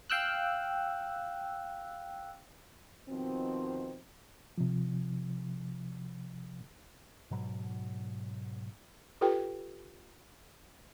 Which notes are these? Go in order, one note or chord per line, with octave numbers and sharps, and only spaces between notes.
F5 G5 E6 F#6
B2 D#3 F3 C4
C3 F3
G#2 B2 F#3
F4 G4 A4 B4 G5